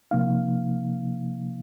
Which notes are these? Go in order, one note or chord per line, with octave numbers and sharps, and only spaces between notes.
C3 F3 A#3 D#4 F5